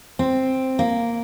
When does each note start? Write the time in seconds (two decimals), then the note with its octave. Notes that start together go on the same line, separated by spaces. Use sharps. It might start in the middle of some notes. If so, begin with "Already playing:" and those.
0.19 C4
0.79 A#3